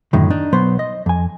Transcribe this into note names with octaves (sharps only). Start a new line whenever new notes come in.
F#2 A2 D3 D#3
D4 D#4
B1 F#3 B3 C5
D#5
F2 G#5